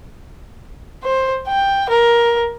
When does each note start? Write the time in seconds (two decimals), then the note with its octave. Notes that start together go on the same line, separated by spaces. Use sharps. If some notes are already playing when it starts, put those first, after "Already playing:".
1.04 C5
1.48 G5
1.89 A#4